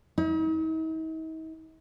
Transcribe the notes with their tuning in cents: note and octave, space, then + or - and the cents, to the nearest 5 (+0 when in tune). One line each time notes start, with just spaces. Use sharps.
D#4 +45